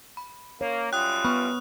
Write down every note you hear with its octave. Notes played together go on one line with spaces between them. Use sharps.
B5
A#3 C#5
F#2 G3 F4 G5 D#6 F#6
B3 B5 C#6 F6